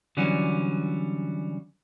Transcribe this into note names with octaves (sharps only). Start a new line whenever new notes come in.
D3 E3 F#3 G3 C#4